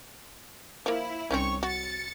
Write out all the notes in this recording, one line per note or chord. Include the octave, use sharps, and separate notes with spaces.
F3 A#3 E4
C2 C4 C#4 D#4 C#5 C#6
F#4 A6 C#7